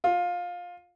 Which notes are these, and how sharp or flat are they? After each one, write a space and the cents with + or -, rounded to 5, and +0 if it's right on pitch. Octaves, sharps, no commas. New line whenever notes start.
F4 +20